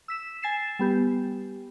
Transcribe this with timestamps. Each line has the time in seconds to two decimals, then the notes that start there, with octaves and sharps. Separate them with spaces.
0.08 E6 B6 E7
0.42 G#5 A6 C7 E7
0.79 G3 B3 G4